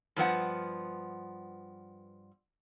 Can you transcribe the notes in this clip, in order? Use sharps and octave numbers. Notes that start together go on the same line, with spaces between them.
G2 F3 B3 F#5